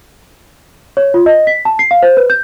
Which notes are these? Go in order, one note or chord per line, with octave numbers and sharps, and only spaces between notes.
C#5
F4
D#5
B6
A5
C7
F5
C5
B4
G6